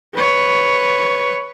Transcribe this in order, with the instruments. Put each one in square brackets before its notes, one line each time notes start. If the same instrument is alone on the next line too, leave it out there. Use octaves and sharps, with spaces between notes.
[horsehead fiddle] B4 C#5